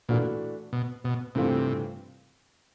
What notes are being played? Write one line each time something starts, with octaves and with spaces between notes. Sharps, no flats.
A#2 E3 A3 D4 F#4 B4
B2
B2
G2 C3 E3 A3 C4 F4